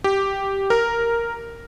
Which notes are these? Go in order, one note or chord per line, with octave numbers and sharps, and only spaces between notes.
G4
A#4